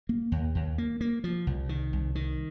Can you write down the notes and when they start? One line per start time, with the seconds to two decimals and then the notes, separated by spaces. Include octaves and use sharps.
0.09 A#3
0.32 D#2
0.55 D#2
0.78 A#3
1.01 A#3
1.24 F3
1.47 C2
1.69 D#3
1.93 C2
2.15 D#3